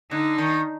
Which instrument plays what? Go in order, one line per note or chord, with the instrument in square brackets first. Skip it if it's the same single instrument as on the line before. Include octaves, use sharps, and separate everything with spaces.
[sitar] D3 [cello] D#4
[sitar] D#3